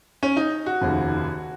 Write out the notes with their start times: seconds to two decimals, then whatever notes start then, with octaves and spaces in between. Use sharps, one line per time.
0.23 C#4
0.37 D#4
0.66 F#4
0.81 F1 D#2 C#3 F3